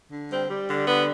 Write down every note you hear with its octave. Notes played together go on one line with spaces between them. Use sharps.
D3
G3 C4
G3
D3
G3 B3